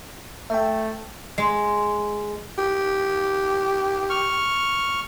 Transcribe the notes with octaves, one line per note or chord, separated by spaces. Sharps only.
A3 E5 G5
G#3
G4
C#6 F6